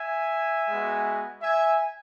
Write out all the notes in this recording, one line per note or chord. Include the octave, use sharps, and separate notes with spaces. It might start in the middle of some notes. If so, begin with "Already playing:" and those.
Already playing: E5 G#5
G#3 B3 F#4
E5 G#5